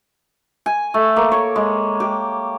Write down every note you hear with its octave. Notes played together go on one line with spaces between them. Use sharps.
G#5
A3
A#3
C#5
G#3
G4